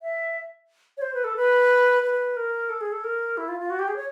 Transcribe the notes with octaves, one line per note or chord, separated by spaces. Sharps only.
E5
C#5
C5
B4
A4
B4
B4
A#4
A4
G#4
A4
A#4
E4
F4
F4
F#4
G4
G#4
C#5